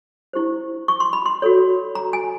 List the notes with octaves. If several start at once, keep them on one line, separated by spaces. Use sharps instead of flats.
E4 G4 C5
C#6
C6
B5
C6
F#4 A4 C#5
A#5
G#5